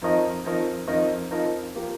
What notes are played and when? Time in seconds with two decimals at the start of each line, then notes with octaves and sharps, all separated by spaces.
0.01 F2 F3 D#4 A#4 D#5
0.44 F2 F3 D#4 A#4 D#5
0.88 F2 F3 D#4 A#4 D#5
1.31 F2 F3 D#4 A#4 D#5
1.75 F3 A#3 G4